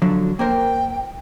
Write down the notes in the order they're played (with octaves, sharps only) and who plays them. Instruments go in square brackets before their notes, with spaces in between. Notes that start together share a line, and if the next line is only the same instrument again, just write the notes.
[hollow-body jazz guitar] D3 F3 F#3
[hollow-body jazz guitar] A#3 A#4 C5 [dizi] G5